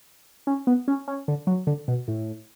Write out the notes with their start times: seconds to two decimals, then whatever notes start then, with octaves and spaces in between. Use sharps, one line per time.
0.47 C#4
0.67 B3
0.88 C#4
1.08 C#4
1.28 D3
1.47 F#3
1.67 D3
1.88 B2
2.08 A2